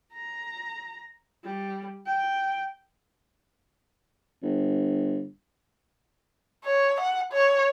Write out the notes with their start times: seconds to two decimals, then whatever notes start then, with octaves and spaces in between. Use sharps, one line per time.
0.13 A#5
1.44 G3
2.06 G5
4.42 G1
6.65 C#5
7.01 F#5
7.33 C#5